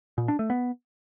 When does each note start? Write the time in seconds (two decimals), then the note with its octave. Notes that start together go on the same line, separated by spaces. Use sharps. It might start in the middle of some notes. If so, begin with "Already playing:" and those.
0.18 A#2
0.28 D4
0.39 A3
0.50 B3